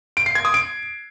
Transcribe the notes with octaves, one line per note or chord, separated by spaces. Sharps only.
D7
C7
G#6
D#6
D7